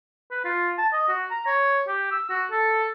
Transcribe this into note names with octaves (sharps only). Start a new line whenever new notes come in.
B4
F4
A5
D#5
F#4
A#5
C#5
G4
E6
F#4
A4